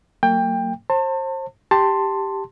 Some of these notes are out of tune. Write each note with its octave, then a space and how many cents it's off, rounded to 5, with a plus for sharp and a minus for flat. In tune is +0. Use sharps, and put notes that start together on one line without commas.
F#3 +0 A#3 -40 G5 +20
C5 +30 A5 +35
G4 +0 A5 +15 C6 +0